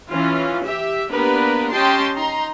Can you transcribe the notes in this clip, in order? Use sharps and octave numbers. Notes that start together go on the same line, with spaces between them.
E3 C#4 F4
G4 E5
A#3 B3 D4 G4 A#4 B4
C#4 G4 D#5 G5 A5 C6
D#4 A#5 C6